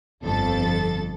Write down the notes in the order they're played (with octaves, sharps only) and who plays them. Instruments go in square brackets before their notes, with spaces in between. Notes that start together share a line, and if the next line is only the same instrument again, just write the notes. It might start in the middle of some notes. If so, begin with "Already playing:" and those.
[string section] G1 F2 A4 A6